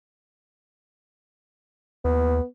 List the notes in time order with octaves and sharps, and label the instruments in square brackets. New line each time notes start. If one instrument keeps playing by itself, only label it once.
[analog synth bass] D#2 [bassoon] B3